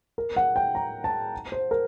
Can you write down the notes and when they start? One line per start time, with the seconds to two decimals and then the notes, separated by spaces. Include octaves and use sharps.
0.18 A#4
0.36 F#5
0.56 G5
0.75 A#5
1.04 A5
1.52 C5
1.71 A#4